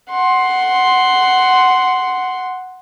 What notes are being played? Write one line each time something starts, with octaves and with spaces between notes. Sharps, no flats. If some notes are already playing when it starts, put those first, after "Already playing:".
F#5 C6